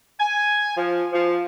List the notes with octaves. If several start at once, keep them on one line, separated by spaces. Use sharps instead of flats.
G#5
F3
F3